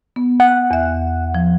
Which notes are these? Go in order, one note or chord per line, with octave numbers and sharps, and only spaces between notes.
B3
F#5
E2 E5
F3